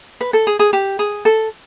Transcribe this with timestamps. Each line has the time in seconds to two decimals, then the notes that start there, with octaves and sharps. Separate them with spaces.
0.21 B4
0.33 A4
0.47 G#4
0.59 G#4
0.73 G4
0.99 G#4
1.25 A4